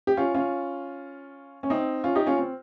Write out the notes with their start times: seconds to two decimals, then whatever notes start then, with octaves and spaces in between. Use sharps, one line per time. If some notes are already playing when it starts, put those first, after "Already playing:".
0.07 G4
0.17 C#4 F4
0.34 C#4 F4
1.63 C#4
1.70 C4 D#4
2.04 C#4 F4
2.15 D#4 G4
2.27 C#4 F4
2.38 C4